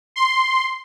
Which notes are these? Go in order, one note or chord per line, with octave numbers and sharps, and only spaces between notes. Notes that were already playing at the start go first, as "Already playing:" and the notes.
C6